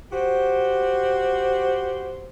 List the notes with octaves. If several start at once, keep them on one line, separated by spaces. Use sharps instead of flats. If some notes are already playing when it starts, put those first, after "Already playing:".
F#4 G4 C5